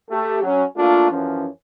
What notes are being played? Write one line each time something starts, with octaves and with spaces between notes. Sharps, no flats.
A3 G4
F#3 C#4
A3 A#3 D4 F4
F#2 E3 F3 C#4